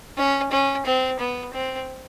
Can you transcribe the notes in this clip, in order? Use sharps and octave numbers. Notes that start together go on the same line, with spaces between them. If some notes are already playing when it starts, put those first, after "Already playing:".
C#4
C#4
C4
B3
C4